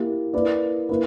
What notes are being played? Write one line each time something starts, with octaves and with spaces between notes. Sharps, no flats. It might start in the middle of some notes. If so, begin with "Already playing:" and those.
Already playing: A#3 E4 G4
A#3 E4 B4 D5
A#3 E4 B4